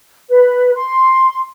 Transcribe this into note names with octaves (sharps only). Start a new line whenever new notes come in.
B4
C6